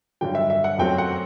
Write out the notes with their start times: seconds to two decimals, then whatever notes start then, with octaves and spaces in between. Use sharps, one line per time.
0.21 G2 D3 F#3 G5
0.35 E5
0.50 E5
0.64 F#5
0.78 F#2 F#3 A3 C4 G5
0.98 F#5